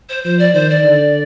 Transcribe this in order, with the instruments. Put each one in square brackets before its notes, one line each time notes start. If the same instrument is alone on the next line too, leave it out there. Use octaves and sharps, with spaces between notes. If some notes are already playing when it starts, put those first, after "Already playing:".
[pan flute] C5
[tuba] F3 [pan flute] C5
[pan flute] D5
[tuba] D#3 [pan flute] C5
[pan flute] D5
[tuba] D3